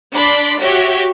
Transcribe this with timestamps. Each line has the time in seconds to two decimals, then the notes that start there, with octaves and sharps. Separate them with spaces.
0.14 D4 D5 B5 C6 B6
0.60 F#4 G4 C#5 E5